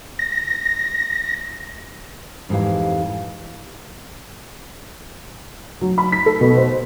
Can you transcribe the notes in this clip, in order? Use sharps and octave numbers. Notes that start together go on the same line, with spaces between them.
A#6
F2 G#2 E3 G4 F5
F#3
B5
B6
A4
B2
C5